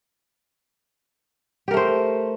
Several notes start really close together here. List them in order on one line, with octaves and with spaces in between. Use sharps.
G4 A#4 A3 C5